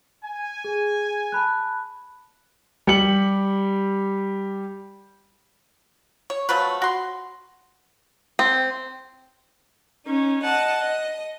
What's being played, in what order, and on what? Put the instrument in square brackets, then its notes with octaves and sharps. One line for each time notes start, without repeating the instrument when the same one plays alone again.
[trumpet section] G#5
[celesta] G#4
A5 B5 F#6
[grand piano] G3 G4 C#7 F#7
[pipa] C#5
F3 F#3 A3 B4
F#4 C6
[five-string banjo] C4
[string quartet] C#4 D#4
D#5 F#5 A5
D#5